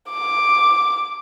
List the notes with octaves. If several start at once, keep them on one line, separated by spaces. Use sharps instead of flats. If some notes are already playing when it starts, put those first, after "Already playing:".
D6